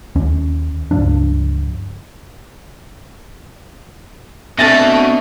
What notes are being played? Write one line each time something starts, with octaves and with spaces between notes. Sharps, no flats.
D#2 C#4
C#2 G2 F3 D4
B2 A3 C4 D4 E5 A6 A#6